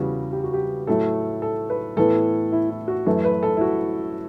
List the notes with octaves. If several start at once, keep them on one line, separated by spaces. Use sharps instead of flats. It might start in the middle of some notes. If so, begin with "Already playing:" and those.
Already playing: E2 C#3 G3 F#4
G4
F#4
G4
A2 F#3 A3 A4
A4
B4
A2 E3 B3 A4
E4
E4
F#4
F#2 E3 A3 A4
B4
A4
E4
F#4